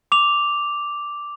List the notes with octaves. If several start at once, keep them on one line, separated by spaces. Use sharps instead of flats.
D6 F7